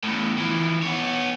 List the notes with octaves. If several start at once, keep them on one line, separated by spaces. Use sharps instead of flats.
E2 A2
E3 F3
B3 C#5